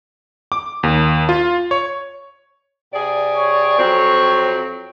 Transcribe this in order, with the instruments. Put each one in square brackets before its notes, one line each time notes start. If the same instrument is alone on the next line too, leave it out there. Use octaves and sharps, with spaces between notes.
[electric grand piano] D6
D#2
F4
C#5
[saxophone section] C3 G#4 D5
[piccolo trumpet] C#5
[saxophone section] F2 F#3 C4